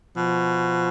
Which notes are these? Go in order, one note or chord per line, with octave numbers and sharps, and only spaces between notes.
B2 F3